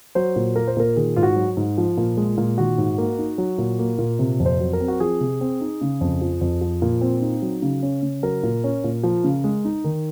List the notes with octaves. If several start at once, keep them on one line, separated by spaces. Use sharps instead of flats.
F#3 C5
A#2
A#3 A#4
C5
A#2 A#4
D#3 G#4
G#2 F4
F#4
F#3
G#2
F3
A#2
G#3
A#2
D#3 F#4
G#2
A#3
D#4
F#3
A#2
A#3
A#2
C3
F2
C5
F#3
A#4
C4
F#4
F3 G#4
C3
C4
D#4
C#3
F2
F3
F2
F3
A#2
C4
D#4
F#3
C#3
C#4
C#3
F#3 A#4
A#2
C#4
A#2
F3
C#3
G#3
D#4
D#3